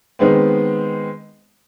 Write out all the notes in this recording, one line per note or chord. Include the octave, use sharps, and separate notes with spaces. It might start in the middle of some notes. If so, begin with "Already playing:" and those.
D#3 G#3 B3 C4